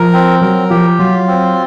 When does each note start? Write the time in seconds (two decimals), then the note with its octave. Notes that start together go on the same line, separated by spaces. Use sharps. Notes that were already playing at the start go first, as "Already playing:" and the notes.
Already playing: F3 A#4
0.13 C4
0.41 F#3 A#4
0.70 F3 G4
0.99 F#3 F4
1.28 C4